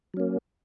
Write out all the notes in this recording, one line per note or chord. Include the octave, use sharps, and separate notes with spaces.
F#3 A#3 C#4